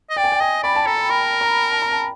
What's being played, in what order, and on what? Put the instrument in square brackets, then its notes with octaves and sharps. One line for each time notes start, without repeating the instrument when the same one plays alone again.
[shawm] D#5
[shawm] D5 [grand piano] G5
[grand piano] G#5
G5
[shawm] D#5 [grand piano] G#5
[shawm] D5 [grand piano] B5
[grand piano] A5
[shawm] A4 [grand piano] A#5
[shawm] A#4 [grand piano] B5
[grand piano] A#5
A5
A#5
A5